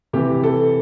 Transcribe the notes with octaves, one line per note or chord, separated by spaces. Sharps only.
C3 E3 G4
A4